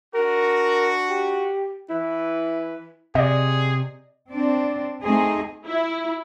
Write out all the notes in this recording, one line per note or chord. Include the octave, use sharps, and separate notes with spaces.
D4 F#4 A#4
G4
E3 E4 B4
C3 G#4 D5 D#5
C4 D4 D5
A3 C4 D#4 G#4
E4